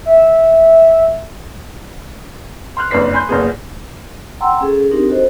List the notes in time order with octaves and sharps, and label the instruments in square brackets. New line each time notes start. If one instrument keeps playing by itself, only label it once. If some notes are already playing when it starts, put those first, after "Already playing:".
[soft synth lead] E5
[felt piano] C6 F6 F#6
F#1 F2 D4 B4 B6 C7
G#5 B5 C6 G6
F#1 A#2 B3 G#4
[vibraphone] F#5 G5 A#5 C6 E6
C#4 G#4 A4
C4 D4 D#4 G4 A#4
F#4 A4 C5 D#5